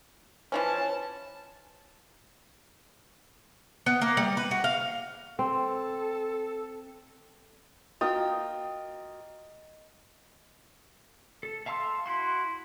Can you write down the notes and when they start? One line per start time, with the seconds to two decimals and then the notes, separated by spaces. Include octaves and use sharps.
0.52 E3 F3 C#4 C#5 A5
3.86 B3
4.02 A#3
4.17 G3
4.37 B4
4.51 F#4
4.64 F5
5.39 C4 A4
8.01 A#3 F4 F#4 D#5 G5 D#6
11.43 A4
11.66 E5 F5 A5 C6 E6
12.06 E4 F#4 C6